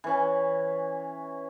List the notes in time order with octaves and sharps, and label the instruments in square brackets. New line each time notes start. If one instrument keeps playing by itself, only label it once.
[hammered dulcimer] E3 C#4